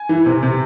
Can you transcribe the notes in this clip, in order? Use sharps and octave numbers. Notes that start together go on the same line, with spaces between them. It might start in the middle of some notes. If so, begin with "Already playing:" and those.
Already playing: G#5
E3
C3
C3